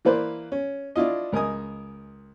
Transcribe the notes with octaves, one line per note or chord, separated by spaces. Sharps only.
E3 A#3 B4 C5 D5
C#4
D4 E4 F4 D#5
C#2 A#4 D#5 G#5 D#6